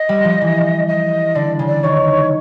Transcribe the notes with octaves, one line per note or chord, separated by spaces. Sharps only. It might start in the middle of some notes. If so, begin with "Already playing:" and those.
Already playing: D#5
G3
F3
E3
D#5
D3 D5
C#3
D5
D#3 C#5